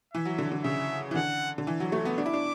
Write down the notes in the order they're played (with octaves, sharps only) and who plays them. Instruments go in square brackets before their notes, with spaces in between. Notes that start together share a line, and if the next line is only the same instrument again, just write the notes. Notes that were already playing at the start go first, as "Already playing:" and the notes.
[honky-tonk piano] E3 [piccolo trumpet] E5
[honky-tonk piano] F#3
D3
D3
[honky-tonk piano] C#3 [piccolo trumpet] E5
[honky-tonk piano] E3
[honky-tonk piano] D3 [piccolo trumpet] F#5
[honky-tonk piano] D3
E3
F#3
A3
B3
[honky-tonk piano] D4 [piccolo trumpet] D6
[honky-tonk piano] E4
D4